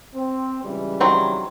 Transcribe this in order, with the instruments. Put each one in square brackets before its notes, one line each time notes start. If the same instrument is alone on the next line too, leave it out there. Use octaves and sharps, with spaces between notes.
[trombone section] C4
C#2 E3 G3
[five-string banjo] D#3 F#3 C4